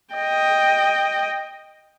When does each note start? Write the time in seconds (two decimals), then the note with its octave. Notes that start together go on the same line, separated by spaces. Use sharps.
0.15 D#5 G5